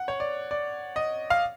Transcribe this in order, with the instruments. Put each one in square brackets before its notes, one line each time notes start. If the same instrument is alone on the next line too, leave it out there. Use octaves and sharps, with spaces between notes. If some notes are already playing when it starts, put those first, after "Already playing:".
Already playing: [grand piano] F#5
C#5
D5
D5
D#5
F5